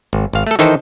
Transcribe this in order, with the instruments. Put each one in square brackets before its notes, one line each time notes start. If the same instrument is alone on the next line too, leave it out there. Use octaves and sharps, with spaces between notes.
[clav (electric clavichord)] G#1
G#1 F5
A3 A4
D#3 E3 D#4 A4 C5 G5